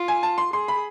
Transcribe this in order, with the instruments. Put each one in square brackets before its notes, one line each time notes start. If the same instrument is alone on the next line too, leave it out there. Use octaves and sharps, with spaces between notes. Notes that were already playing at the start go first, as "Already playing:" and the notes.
Already playing: [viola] F4
[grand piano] G#5
A5
C6
[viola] G#4 [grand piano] C6
[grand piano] B5